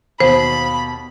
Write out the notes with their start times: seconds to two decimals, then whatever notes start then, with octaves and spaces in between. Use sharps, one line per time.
0.20 D#2 B2 C5 B5 F#7